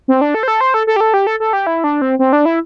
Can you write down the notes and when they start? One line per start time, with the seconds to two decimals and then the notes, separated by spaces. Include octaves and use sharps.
0.08 C4
0.21 D4
0.35 A4
0.43 C5
0.48 A4
0.61 C5
0.74 A4
0.87 A4
0.96 G4
1.00 A4
1.14 G4
1.27 A4
1.40 A4
1.53 G4
1.67 E4
1.84 D4
2.02 C4
2.19 C4
2.33 D4
2.45 E4